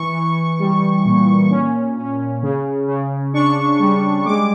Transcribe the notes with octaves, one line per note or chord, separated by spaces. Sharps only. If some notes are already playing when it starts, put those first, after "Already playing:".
Already playing: E3 C#6
E3
G3
A#2
C#4
C#4
C#3
C#3
D4 C#6
G3
G#3 D6